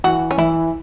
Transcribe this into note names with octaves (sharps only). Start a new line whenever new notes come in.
E3 F#4
C#4
E3 E4